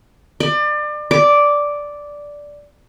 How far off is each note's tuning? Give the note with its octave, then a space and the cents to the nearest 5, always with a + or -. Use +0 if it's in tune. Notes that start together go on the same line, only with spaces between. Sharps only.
D5 +30
D5 -5